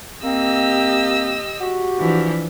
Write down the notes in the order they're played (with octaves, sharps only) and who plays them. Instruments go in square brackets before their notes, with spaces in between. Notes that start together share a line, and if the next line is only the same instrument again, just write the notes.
[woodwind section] A#3 C4 [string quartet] G4 D#5 E6
[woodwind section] F#4 G4
[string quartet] E3 F3 D4